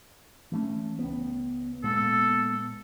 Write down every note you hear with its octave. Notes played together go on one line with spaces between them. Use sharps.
E3 A3 C#4
C#2 B3
A#2 G#3 B3 A4